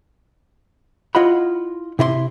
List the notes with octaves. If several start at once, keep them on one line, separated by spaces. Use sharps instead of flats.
E4 F4 D#5 F#5 B5
C3 E4 D5 C6